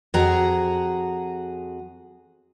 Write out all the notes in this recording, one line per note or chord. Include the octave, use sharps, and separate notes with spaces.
F2 F#4 G#4 A#5